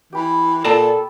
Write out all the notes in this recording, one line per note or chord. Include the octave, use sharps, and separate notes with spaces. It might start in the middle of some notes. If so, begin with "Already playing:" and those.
E3 G4 B5
A#2 A4 D5 A5 A#5